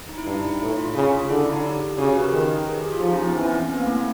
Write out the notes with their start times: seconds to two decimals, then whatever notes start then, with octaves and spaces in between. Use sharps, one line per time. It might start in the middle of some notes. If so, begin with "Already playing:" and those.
0.09 D#4
0.18 E4
0.26 G2 D4
0.43 D#4
0.60 A2 E4
0.78 F4
0.95 C#3 F4
1.29 D3 E4
1.40 D#4
1.52 D4
1.64 G4
1.98 C#3 F#4
2.06 G4
2.15 B4
2.24 A#4
2.33 D#3
2.67 G#4
2.75 G4
2.92 F4
3.01 F3 D#4
3.13 C#4
3.24 C4
3.30 B3
3.35 E3 C4
3.43 C#4
3.47 C4
3.59 B3
3.70 B3
3.79 A#3
3.87 A3
3.96 A#3